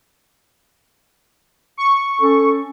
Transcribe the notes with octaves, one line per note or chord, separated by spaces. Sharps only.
C#6
C#4 A4